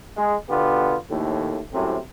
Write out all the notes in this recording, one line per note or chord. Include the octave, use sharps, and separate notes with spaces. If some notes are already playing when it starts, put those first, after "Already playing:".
G#3
B2 D3 B3 F4 G4
A#1 D#2 A2 A3
C2 F#2 A2 C3